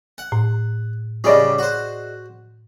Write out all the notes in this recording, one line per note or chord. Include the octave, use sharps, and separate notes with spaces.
F#5
A2
C#3 G3 C#4 G#4 D5 D#5
F#4 C5